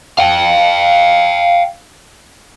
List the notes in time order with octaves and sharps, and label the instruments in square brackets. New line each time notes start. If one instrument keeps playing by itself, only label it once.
[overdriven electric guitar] F5 G5